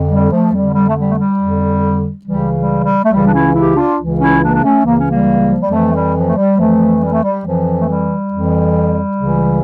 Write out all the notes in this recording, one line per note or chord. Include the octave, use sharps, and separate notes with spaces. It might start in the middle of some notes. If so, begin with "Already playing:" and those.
Already playing: F2 D3
G3
F3 A3
F2 D3 G3
G3
A3
G3
A3
G3
F2 D3
C#2 C#3 E3 G3
G3
G3
A3
C#2 C#3 E3 G3
D4
C#4 E4
E4 G4
D4 F4
C#2 C#3 E3
C#4 E4
A#3 D4
D4
A3 C#4
C#2 C#3 E3 A#3
C#4
G3 A#3
F3
G3
F2 E3 F3 A3
G3
F3
A3
G3
F2 E3 F3 A3
G3
A3
G3
F2 E3 F3
A3
G3
F2 E3
C#2 C#3 E3